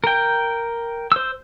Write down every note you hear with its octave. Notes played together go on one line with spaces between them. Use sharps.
A#4 G5
C5 E6